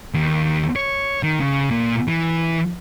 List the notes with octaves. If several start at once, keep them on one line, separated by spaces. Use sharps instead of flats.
D#2
C#5
D#3
C#3
A#2
E3